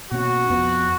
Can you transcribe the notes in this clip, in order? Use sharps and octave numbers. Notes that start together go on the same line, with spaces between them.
B2 A#3 C#4 F#4
F2 F3 B3